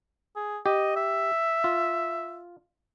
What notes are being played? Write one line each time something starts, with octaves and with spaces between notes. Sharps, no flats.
G#4
G4 D#5
E5
F4